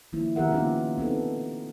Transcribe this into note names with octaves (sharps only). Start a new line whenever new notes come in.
D#3 F3 A#3 E4
D#3 B3 G4 A#4 E5 F#5
A#3 B3 C#4 D#4 F4 G4
B3 C4 D#4 A4